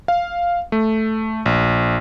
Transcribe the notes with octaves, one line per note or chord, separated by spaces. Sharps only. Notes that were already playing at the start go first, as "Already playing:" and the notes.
F5
A3
A#1